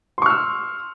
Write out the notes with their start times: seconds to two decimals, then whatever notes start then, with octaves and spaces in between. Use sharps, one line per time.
0.18 C6
0.22 C#6
0.26 F6
0.30 E6